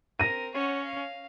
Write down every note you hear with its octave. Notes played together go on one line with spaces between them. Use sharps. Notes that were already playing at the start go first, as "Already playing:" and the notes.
C4 A#4 A#6 D#7
C#4 C#5 F#5
F5